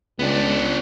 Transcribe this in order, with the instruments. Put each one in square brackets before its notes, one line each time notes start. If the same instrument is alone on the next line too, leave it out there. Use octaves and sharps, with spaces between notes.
[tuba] C#2 [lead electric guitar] B3 D4